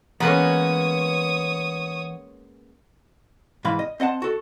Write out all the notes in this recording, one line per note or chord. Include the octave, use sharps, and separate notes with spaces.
E3 G#3 A#3 B3 C#4 C#5 A#5 D#6
G#2 E3 F5 B5
D#5
C4 D#5 F#5 A5
F#4 A4